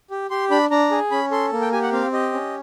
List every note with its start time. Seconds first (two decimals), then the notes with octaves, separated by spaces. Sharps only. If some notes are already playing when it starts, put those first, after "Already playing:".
0.11 G4
0.31 G4 C6
0.51 D4 B5
0.71 D4 A#5
0.91 G#4
1.11 C#4 B5
1.31 A4 C6
1.52 A#3
1.61 G5
1.72 G4 G#5
1.82 F#5
1.92 C4 F5
2.12 G4 D#5
2.32 C#4